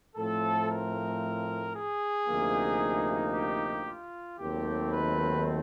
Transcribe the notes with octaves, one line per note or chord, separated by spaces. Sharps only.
A2 F3 A3 C4 A4
A#4
G#4
D2 C3 F3 A#3 D#4
G4
F4
D#2 D#3 F#3 A3 C4 G4
B4